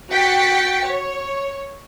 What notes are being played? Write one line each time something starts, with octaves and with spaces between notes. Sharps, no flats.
F#4 G5 A6 B6 C#7
C#5